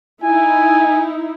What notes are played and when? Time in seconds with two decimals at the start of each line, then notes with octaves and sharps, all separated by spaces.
0.23 D#4 E4 G#5